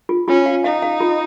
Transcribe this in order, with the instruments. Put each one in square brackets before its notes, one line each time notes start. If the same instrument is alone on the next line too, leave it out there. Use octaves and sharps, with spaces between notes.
[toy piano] F4
[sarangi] C#4 [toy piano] F4
[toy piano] F5
[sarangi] D#4 [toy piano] F5
[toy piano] F5
F4